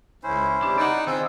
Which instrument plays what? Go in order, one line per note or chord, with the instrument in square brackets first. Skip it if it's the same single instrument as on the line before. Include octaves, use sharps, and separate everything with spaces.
[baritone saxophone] C#2 [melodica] C#4 E4 C5
[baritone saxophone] C3 [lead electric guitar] D4
[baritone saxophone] D#4 [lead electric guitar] D5 F#5
[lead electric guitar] D#3 [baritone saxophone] C4 [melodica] F4 G#4 D#6 [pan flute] E6